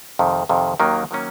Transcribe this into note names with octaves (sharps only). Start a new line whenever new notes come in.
F2 C3 D#3
F2 C3 D#3
D#2 D#3 F#3 A#3 C#4
D#3 F#3 A#3 C#4